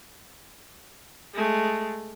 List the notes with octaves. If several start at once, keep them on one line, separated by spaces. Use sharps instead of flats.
G#3 A3